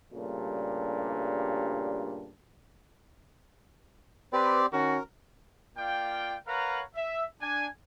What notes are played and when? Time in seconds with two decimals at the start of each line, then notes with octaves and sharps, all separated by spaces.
0.13 G2 A#2 C#3 G3 A3 D4
4.33 C4 G4 B4 D5
4.73 D#3 C#4 F#4 A#4
5.76 A#3 F4 D5 F5 G5
6.47 A#4 B4 C#5 F5 F#5 A#5
6.95 E5
7.41 D4 G#5